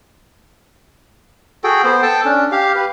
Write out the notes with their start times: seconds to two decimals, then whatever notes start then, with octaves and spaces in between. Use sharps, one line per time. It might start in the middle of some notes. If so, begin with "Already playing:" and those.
1.64 F#4 G#4 A4 G5
1.84 B3 C5
2.02 A4 G5 A5
2.25 C#4 D4
2.52 G4 F5
2.75 G4 B4